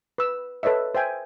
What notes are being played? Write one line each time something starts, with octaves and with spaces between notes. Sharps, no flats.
B4 E6
A4 B4 C#5 D#5 E5
C5 E5 G5 G#5